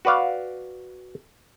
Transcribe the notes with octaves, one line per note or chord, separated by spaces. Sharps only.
F#4 B4 D5 F5